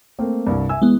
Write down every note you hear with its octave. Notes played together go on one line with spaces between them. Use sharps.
A3 A#3 C4
C2 G2
E5 G#5 E6
E3 G#3 B3